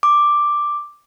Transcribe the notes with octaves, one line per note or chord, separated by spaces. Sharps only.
D6